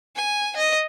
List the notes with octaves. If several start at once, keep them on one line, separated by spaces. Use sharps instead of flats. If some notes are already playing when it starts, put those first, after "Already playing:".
G#5
D#5